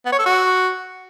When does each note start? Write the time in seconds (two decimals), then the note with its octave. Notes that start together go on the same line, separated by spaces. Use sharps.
0.05 B3
0.12 C#5
0.19 A4
0.26 F#4